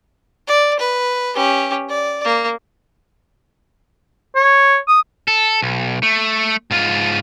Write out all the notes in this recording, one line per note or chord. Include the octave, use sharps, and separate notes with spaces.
D5
B4
C#4 G4
D5
A#3
C#5
D#6
A4
B1
A3
G#2 F4